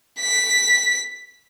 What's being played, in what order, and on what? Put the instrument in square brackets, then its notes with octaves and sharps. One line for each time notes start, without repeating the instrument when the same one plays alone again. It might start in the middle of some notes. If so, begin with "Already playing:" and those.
[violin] B6